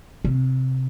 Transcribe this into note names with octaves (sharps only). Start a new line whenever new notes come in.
C3